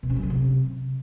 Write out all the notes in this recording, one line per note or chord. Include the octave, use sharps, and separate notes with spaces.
B2
C#4
F#3
C#3
C3